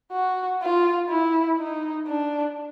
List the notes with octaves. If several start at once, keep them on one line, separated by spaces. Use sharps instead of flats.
F#4
F4
E4
D#4
D4